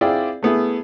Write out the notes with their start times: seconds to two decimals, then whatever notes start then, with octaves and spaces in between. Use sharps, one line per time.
0.01 C4 E4 F4 G#4 D5 G5
0.43 A3 B3 E4 G#4